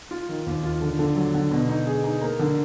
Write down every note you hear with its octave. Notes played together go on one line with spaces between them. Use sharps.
F4
D#3
D#2
F4
D3
D3
F#3
D3
B2
D#4
G#4
D#4
A#3
D3